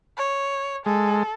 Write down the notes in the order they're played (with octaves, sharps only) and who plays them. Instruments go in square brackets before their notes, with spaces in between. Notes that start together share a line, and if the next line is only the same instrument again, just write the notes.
[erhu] C#5
[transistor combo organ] G#3 [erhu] A4